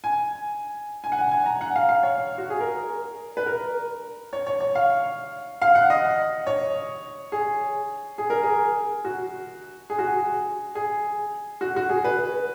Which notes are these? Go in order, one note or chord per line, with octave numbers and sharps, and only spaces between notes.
G#5
G#5
F#5
G#5
G#5
A#5
F#5
F5
F5
C#5
F#4
G#4
A#4
B4
A#4
C#5
C#5
C#5
F5
F5
F#5
D#5
C#5
G#4
G#4
A#4
G#4
F#4
G#4
F#4
G#4
G#4
F#4
F#4
G#4
B4